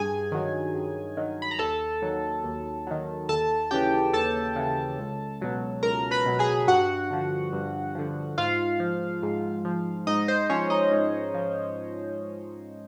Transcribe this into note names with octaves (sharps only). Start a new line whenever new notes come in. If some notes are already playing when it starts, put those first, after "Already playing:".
Already playing: G2 G#4 G#5
D#3 F#3
G2
D#3 F#3
B5
A#5
D#2 A4 A5
D#3 F#3
D#2
D#3 F#3
D#2 A4 A5
C#3 E3 G4 G5
D#2 A4 A5
C#3 E3
C#2
B2 F#3
C#2 A#4 A#5
B4 B5
B2 F#3
G#4 G#5
G2 F#4 F#5
D3 F3
G2
D3 F3
G#2 F4 F5
F3
G#2
F3
G#2 D#4 D#5
C5
F3 C#4 C#5
D#4 D#5
G#2
F3